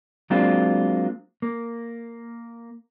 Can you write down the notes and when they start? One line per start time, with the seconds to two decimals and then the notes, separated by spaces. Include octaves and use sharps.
0.30 F#3 G#3 A#3 C4 D4 F4
1.42 A#3